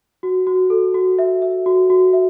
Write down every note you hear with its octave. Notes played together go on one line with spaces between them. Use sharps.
F#4
F#4
A4
F#4
E5
E5
F#4
F#4
E5